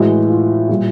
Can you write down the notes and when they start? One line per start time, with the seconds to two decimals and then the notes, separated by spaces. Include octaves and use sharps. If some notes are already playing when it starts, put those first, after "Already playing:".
Already playing: A2 E3 G#3 F#4
0.30 F4
0.69 A#2 G3